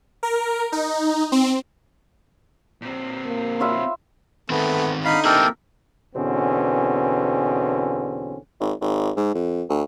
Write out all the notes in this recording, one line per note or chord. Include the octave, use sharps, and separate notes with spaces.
A#4
D#4
C4
A#2 C4
A#3
E4 F4 E5
D#3 A3 B3 C4
D3 D#4 F5 B5
A#3 C4 E4 G4 A4 A#4
E2 B2 D3 C4 C#4
G#1
G#1
G#2
F2
D2